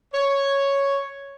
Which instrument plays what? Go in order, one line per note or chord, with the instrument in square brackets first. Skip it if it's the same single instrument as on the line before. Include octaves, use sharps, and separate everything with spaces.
[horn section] C#5